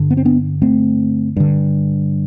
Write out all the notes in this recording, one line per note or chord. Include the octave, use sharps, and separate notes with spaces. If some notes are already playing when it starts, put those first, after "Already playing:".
Already playing: G2 D3
B3
C4
B3 D4
A3 C4
G2 D3